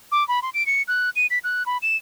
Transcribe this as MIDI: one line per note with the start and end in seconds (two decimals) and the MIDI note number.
0.12 0.26 86
0.28 0.40 83
0.42 0.50 84
0.54 0.66 98
0.66 0.82 97
0.88 1.10 90
1.16 1.27 99
1.30 1.39 95
1.44 1.66 90
1.66 1.78 83
1.82 1.97 100